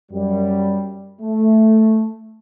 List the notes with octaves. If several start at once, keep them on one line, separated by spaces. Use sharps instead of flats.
F#2 G3
A3